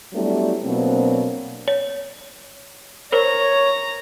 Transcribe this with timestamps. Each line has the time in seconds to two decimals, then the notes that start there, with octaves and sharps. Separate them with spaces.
0.13 F#3 G3 A3 B3 D4 E4
0.63 B2 F#3 A#3 C4 D4 C5
1.68 C#5
3.12 A#4 C5 C#5 A#5